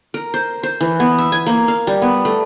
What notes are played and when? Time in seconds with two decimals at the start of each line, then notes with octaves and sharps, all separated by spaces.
0.14 A#4
0.34 C5
0.63 C5
0.81 E3
1.00 B3
1.18 E5
1.32 G#5
1.46 A#3
1.68 F5
1.87 G3
2.02 B3
2.25 A3